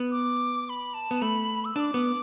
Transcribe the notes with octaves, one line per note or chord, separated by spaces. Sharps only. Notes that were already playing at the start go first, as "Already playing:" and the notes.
Already playing: B3
D6
D6
B5
A5
B3
A3 B5
E6
D4 D6 E6
B3